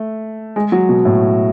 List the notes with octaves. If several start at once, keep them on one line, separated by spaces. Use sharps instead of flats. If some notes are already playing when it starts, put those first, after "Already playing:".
Already playing: A3
G#3
F#3
B2
A2